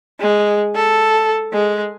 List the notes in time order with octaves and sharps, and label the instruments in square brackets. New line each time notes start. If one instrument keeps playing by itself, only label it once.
[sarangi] G#3
A4
G#3